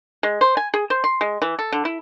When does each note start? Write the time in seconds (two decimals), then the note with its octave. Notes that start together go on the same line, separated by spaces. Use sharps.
0.23 G#3
0.41 C5
0.57 G#5
0.74 G#4
0.90 C5
1.04 C6
1.21 G#3
1.42 E3
1.59 A4
1.72 D3
1.85 E4